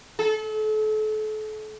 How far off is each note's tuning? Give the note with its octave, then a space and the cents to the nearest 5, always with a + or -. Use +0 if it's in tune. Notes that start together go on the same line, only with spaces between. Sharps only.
A4 -35